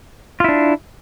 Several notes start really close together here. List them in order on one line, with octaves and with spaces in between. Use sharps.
F4 E4 D4